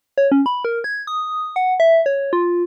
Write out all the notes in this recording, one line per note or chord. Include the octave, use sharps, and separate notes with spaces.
C#5
C#4
B5
A#4
G#6
D#6
F#5
E5
C#5
F4